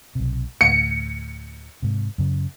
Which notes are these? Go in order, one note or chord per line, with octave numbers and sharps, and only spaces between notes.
B1 C3
D2 A2 C#7
G#2 C3
F#2 C#3